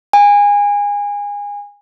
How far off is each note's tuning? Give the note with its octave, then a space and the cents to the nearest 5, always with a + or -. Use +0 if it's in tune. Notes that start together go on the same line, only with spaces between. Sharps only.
G#5 -25